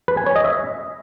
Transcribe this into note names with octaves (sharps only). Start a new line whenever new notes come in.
B4
G#5
C#5
D#5
E5